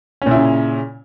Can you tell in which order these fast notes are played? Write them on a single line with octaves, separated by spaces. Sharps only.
C#4 A#2 E4 C#3